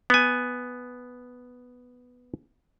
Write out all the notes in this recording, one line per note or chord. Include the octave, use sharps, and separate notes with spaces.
B3 G#5